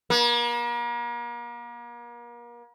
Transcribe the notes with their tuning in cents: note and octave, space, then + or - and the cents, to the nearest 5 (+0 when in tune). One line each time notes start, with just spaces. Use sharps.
A#3 +40